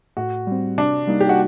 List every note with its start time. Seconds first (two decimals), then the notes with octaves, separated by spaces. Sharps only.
0.17 A2 F#4
0.47 G3 C4
0.77 C3 D4
1.07 G3 A#3 D#4
1.20 G4
1.29 F#4